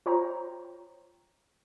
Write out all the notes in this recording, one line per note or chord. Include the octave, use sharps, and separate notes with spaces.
F4 C5 C#5 G5 A#5